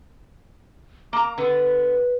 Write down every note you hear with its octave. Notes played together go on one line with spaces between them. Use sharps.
A#3 A#5 D6
D3 B3 B4